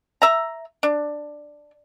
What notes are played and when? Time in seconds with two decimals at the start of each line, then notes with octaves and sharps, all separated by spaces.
0.22 E5 A#5
0.83 D4